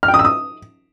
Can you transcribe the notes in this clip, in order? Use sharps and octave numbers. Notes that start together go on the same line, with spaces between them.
F6
G5
D#6
E6
D#6